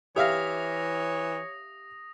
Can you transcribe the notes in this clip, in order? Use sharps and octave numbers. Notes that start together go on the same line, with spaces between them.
E3 G4 C#5 E5 F5 D#6 A#6